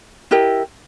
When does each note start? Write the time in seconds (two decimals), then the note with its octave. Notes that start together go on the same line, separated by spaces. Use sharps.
0.31 E4 G4 A#4 D#5